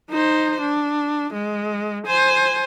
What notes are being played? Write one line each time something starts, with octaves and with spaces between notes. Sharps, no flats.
D#4 C5
D4
G#3
C5 G#5